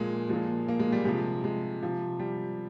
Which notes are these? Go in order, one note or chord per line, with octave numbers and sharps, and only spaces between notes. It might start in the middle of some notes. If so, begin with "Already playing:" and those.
Already playing: A#2 F3 G#3 A#3
A#2 F3 G#3
A#3
G#3
G3
C3 F3 G#3
G#3
C3 F3
G3